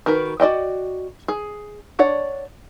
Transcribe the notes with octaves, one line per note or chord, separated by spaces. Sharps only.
D#3 F#4 A#4 B4
F#4 D5 D#5 G5
G#4
D4 C#5 D5 F#5